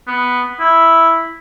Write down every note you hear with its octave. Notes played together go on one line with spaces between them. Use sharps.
B3
E4